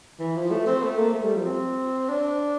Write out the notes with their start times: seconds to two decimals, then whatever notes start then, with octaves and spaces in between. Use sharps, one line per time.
0.19 E3
0.36 F3
0.51 A3
0.66 C4
0.83 A3
0.98 A#3
1.14 A3
1.24 G3
1.36 F3
1.45 C4
2.09 D4